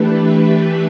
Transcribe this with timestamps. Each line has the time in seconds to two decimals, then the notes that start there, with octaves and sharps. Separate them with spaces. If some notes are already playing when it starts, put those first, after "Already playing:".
Already playing: E3 A3 D4 G4 B4
0.22 E5